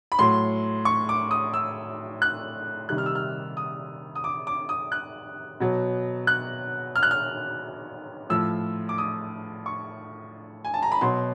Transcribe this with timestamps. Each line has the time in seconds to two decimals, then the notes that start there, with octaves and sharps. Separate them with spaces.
0.12 B5
0.19 A2 F#3 C6
0.85 C#6
1.09 D6
1.31 D#6
1.54 E6
2.22 F#6
2.89 C3 D#3 G3 F#6
2.98 F6
3.06 E6
3.15 F6
3.57 D#6
4.15 D#6
4.24 D6
4.47 D6
4.69 D#6
4.92 F#6
5.60 B2 F#3
6.27 F#6
6.96 F6
7.03 F#6
7.11 F6
8.30 A2 F3 E6
8.89 D6
8.98 D#6
9.66 C#6
10.65 G#5
10.74 A5
10.82 A#5
10.92 B5
11.01 B2 F#3 C6